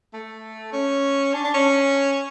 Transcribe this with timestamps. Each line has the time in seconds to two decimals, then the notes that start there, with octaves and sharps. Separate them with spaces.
0.13 A3
0.73 C#4
1.34 D4
1.44 D4
1.54 C#4